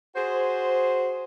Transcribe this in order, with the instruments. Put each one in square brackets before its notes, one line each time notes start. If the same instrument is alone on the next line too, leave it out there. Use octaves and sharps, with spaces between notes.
[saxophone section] F#4 G#4 C5